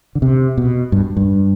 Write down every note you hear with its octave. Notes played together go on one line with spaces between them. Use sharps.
D3
C3
B2
G2
G2